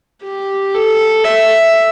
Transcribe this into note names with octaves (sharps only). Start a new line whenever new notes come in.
G4
A4
E5